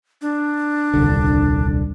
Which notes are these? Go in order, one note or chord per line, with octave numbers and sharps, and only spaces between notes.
D4
D#1 C2 D3